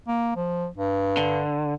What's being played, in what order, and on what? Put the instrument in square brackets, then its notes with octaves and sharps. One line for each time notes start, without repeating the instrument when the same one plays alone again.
[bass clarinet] A#3
F3
G2
[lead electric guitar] D3